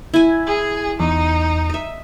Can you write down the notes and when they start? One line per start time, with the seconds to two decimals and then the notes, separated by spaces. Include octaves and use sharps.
0.14 E4 G#5
0.47 G#4
1.00 E2 D#4
1.70 D#5 E5